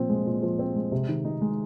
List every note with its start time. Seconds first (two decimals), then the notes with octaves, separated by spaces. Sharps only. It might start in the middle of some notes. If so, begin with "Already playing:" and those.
Already playing: A#2 F3 C4
0.09 G#3
0.26 A#2
0.43 F3
0.59 C4
0.75 G#3
0.92 C3
1.09 D#3
1.25 D#4
1.41 G#3